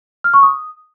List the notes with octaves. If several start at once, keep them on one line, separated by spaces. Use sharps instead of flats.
F6
C#6
D#6